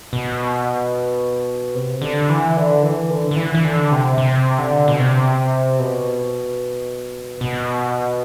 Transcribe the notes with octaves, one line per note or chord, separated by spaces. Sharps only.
B2
C3
D3
E3
D3
E3
D3
D3
E3
E3
D3
C3
C3
D3
B2
C3
B2
B2